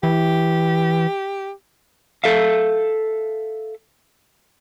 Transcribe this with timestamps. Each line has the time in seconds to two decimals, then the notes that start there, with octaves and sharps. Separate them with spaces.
0.03 E3 G4
2.24 A4 E5 F5